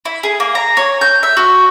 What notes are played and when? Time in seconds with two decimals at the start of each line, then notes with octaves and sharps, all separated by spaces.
0.05 E4
0.23 G#4
0.40 A#3
0.55 A#5
0.77 C#5
1.01 G6
1.23 E5
1.37 F#4